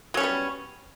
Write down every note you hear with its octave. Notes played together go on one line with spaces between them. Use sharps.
F#3 G3 B3 C#4